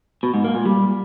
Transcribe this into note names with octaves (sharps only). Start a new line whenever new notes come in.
B2
G#2
A#3
A#2
G3